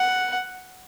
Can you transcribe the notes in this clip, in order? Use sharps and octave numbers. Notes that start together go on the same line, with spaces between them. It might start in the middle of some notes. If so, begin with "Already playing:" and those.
Already playing: F#5